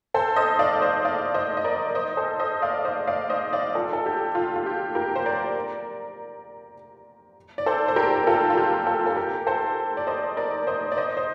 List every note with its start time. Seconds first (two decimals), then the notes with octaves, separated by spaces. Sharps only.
0.14 A4 C5
0.36 C5 D#5
0.59 D5 F5
0.81 C5 D#5
1.05 D5 F5
1.34 C5 D#5
1.57 D#5
1.64 A#4 D5
1.95 C5 D#5
2.17 A4 C5
2.40 C5 D#5
2.62 D5 F5
2.74 D5
2.85 C5 D#5
3.07 D5 F5
3.30 C5 D#5
3.53 D5 F5
3.75 F4 A4
3.93 A4
4.06 G4
4.35 F4
4.56 F4
4.66 G4
4.95 G4 A#4
5.16 C5
5.26 A#4 D5
7.58 D5
7.66 A4 C5
7.88 C5
7.96 G4 A#4
8.16 G4
8.27 F4 A4
8.50 F4
8.57 G4
8.87 F4 A4
9.06 A4
9.16 G4 A#4
9.47 A4 C5
9.97 D5
10.07 C5 D#5
10.37 A#4 D5
10.67 C5 D#5
10.92 D5
10.97 C5 D#5
11.17 C5